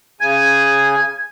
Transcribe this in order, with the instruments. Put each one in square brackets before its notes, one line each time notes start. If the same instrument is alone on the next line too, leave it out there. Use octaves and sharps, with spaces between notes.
[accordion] C#3 G#5 [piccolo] G#6